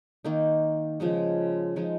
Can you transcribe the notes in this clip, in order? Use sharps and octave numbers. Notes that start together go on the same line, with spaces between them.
D#3 A#3 D#4
C#3 F3 G#3 D#4
F3 G#3 D#4